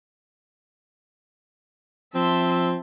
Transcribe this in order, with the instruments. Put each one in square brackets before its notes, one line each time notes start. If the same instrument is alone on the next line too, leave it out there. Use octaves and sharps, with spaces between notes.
[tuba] F3 [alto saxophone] C4 [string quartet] E5 A5 C6